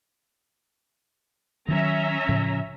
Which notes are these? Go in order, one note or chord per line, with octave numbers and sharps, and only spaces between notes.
D#3 E3 F#3 C#4 E5 A#5
A2 C#3 F3